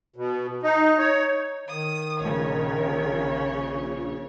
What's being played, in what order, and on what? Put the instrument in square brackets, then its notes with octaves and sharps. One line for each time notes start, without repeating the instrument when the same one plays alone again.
[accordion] B2
D#4
C#5
[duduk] D#3 [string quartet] D#6
[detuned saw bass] A#1 [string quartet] C#3 C#5